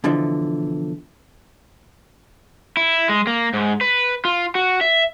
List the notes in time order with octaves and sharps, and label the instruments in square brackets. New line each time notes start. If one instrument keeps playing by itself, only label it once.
[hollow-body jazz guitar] B2 D3 E3 F3
[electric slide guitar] E4
G#3
A#3
G#2
B4
F4
F#4
E5